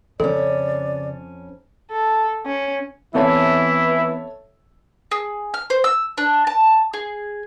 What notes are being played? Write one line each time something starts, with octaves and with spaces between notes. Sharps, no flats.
F2 C#3 C#4 A4 D5
A4
C#4
E3 B3 C4 E4 A4 C#5 E5 A5
G#4
F6
C5
E6
D4
A5
G#4